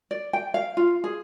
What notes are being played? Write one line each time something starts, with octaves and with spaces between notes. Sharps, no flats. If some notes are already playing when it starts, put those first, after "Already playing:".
D5
G5
F5
F4
G#4